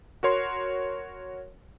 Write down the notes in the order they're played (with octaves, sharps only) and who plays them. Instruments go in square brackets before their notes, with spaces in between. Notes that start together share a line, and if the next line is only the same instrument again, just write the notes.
[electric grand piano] F#4 A#4 C#5 C6